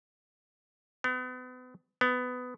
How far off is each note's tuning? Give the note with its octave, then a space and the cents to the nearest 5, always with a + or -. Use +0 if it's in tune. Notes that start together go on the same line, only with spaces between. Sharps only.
B3 +35
B3 +15